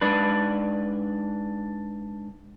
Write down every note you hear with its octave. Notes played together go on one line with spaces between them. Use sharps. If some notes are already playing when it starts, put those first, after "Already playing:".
G#2 D4 B4